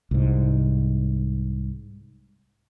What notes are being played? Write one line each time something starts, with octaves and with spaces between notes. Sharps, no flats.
C2 G#2